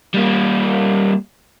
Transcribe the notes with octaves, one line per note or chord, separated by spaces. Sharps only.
G3 A#3